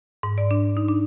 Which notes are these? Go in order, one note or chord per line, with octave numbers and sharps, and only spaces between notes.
G#2
D5
D4
D#4
D4